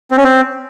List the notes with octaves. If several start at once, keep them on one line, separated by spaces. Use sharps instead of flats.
C4
C#4
C4